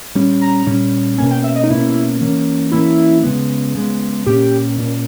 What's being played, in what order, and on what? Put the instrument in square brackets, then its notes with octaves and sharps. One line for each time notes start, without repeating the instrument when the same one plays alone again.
[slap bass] A#2 G3 C#4
[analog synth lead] A#5
[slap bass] A#2 G3 C#4
[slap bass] B2 A#3 C#4 [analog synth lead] G#5
[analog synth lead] G5
E5
D#5
D#4
[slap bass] B2 A#3 C#4 [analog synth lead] E4
[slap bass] E3 A#3 C#4
[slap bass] E3 A#3 C#4 [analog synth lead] E4
[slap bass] C#3 G#3 B3
C#3 G#3 B3
[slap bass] A#2 A#3 C#4 [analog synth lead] G4
[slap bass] A#2 A#3 C#4